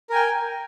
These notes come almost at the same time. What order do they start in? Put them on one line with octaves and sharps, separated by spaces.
A#4 G#5 G5